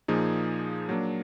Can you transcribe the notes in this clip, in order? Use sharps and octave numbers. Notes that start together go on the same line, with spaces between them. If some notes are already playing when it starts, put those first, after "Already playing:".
A#2 F3 A#3 D#4 G#4
F#3 A#3 D4